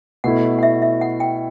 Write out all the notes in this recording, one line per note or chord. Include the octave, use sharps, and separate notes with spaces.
B2 A3 E4 F#5
F#5
E5
E5
F#5
G5